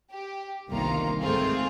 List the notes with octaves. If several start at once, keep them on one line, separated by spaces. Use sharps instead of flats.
G4
G1 C2 D#3 A#3 F4 A#5
G#2 A3 C4 F4 G#4